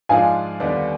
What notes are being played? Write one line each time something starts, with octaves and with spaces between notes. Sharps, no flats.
G#2 F3 G#3 D4 F4 F5 G#5
D#2 D3 G3 B3 D4